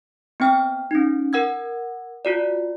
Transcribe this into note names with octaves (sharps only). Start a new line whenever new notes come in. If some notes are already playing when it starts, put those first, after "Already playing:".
B3 C4 G5 F6
C#4 D#4
A#4 F#5 E6 G#6
F4 F#4 D5